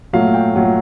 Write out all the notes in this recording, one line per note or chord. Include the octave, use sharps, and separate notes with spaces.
A#2 F#3 A3 F5
G5
A#2 F#3 A3